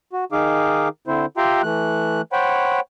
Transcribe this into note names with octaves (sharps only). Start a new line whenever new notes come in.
F#4
D#3 D#4 G#4 F5 D6
D3 C4 E4 C5
F4 G4 E5 G5 A#5 C6
E3 A3 F#6
C5 C#5 F#5 G5 B5